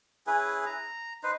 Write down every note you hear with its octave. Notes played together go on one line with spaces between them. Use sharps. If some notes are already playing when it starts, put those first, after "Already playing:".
C#4 E4 G#4 B4
A#5
D#4 B4 C5